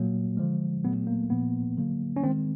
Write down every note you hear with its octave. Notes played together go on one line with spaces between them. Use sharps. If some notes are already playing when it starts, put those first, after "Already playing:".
Already playing: A#2 F#3 A#3
D3 F3 G#3
A#2 F#3 A3 B3
A#3
A#2 F3 A#3 B3
D3 F#3 A#3
C#4
D#3 G#3 C4